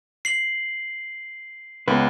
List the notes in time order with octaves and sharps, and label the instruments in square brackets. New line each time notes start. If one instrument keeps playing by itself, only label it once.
[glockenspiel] C7 F#7
[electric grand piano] C#2 [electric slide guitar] B3 B4